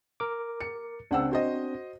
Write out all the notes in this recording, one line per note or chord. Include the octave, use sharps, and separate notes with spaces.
A#4 D6
C#7
C#2 C4 D4 F#5 E6
F#4 C5 D#5